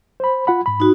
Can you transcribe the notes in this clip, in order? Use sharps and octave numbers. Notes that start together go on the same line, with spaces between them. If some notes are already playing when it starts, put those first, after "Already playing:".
C5 B5
F4 F#5 B5
G#2 B5
D#4 F#4